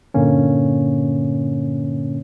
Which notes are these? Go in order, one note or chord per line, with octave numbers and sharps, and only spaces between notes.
G2 A#2 D3 A#3 C#4